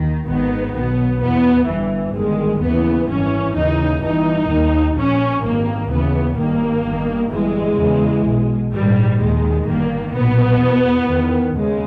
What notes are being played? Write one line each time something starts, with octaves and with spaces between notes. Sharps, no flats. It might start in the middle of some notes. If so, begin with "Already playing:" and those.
Already playing: D#2 D#3
G#1 G#2 D#3 B3
B1 B2 B3
E2 B2 B3
G1 G2 E3
G1 G2 D#3 G#3
D#2 C#3 E3 B3
G#1 G2 E3 C#4
D#2 C#3 E3 D#4
G1 G2 E3 D#4
D#2 D#3
A#1 A#2 C#4
G#1 G2 D#3 A#3
D#2 C#3 E3 B3
G#1 G2 D#3 A#3
G1 G2 D#3
G1 G2 E3 G#3
E2 C#3 E3
B1 B2
A#1 G#2 D#3 G3
D#2 D#3 G#3
G1 G2 D#3 A#3
B1 A#2 B3
E2 B2
E2 D#3
D#2 C#3 G#3